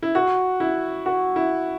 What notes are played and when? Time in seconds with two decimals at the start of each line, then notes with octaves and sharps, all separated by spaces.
0.03 E4
0.15 F#4
0.60 E4
1.06 F#4
1.36 E4